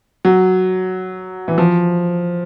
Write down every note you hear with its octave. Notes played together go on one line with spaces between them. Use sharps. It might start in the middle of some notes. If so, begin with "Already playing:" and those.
F#3
E3
F3